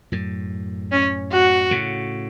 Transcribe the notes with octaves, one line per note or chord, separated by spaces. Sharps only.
F#2 A2
C#4
F#4
A2 C#3